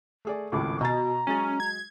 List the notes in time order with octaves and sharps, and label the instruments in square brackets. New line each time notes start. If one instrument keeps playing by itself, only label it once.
[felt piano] A3 G#4 D5
[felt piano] G#1 C#2 A2 [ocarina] D6
[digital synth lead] B2 [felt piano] D#5 A6 [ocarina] A#5
[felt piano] F#3 G#3 A6 [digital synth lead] C#4
[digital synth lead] G#6